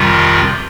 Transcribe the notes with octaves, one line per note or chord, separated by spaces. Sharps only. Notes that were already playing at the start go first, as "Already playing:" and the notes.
Already playing: F2 C3 D#3 G3 F4